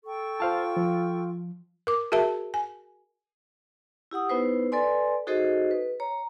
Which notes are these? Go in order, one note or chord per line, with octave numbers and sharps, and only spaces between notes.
A4 G5 C#6
F4 C5 F5 A5
F3
A#4 D6
F#4 G#4 A#4 E5 A5
G#5
E4 G4 F#5 D#6
B3 D#4 E4 B4 C5
A4 B4 D5 G#5 C6
D#4 F#4 G#4 A4 C5 D#5
B4
C#5 A#5